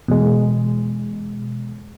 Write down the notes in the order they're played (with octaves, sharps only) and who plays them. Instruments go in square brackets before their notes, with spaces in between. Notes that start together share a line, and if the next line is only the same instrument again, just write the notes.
[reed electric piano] E2 G#3 [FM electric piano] B2